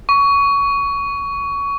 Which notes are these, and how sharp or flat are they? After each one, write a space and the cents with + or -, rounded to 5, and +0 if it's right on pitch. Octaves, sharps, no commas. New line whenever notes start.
C#6 +20